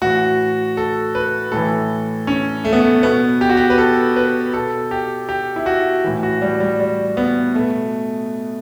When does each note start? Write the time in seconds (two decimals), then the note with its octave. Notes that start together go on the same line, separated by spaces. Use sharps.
0.02 A2 E3 F#4
0.77 A4
1.15 B4
1.52 A2 E3 A4
2.27 C#4
2.65 A3
2.73 B3
2.80 A3
3.03 B2 B3
3.41 G4
3.49 F#4
3.57 G4
3.70 B4
3.78 A4
4.16 B4
4.53 B2 A4
4.91 G4
5.29 G4
5.56 E4
5.66 F#4
6.04 A2 E3
6.23 F#4
6.42 G3
6.60 G3
6.80 G3
7.17 B3
7.54 B2 A3